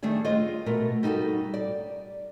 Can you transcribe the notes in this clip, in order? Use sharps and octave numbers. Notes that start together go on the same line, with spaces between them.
D#3 G3 A3 D4 G#4
F4 G#4 C5 D#5
B2 A3 A#4
G3 D#4 F4 F#4 A4
D5